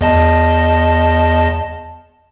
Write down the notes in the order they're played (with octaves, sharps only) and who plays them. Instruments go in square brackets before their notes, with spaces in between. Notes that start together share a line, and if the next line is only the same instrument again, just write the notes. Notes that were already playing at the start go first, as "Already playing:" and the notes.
[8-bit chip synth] E2 D#5 A5